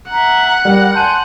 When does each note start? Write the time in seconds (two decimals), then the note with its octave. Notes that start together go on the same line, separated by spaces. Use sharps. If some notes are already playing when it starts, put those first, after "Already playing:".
0.10 E5 F#5 A#5
0.65 G3 A#4
0.94 G#5 A5 C6 G6 D#7